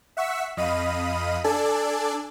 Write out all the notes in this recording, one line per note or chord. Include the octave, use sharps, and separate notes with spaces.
E5 F#5 C#6 E6 B6
F2 D#5 F5 B5 D#7
D4 A4 D5 G#5 A5